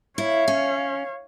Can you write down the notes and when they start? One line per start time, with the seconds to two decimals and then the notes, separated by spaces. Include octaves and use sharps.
0.18 E4 C#5 F5
0.48 C#4